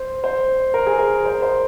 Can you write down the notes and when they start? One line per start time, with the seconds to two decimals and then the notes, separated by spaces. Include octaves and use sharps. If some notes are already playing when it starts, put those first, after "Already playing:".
Already playing: C5
0.24 C5
0.74 A#4
0.87 G#4
0.98 A#4
1.26 C5
1.42 C5